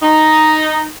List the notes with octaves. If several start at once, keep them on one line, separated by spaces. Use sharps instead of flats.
D#4